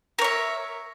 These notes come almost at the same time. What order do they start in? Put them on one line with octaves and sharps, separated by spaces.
A#4 C#5 E5